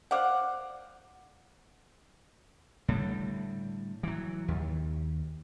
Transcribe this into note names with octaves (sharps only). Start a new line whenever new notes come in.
C5 D5 F5 F#5
A2 D3 G3
E3 F#3
D#2